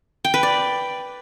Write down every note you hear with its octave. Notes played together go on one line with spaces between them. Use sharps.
G5
B4
D5